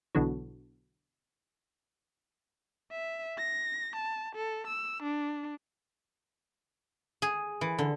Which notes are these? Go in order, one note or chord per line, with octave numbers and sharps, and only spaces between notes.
B1 B2 D3 E3 F#3
E5
A#6
A5
A4
E6
D4
G#4
E3
D3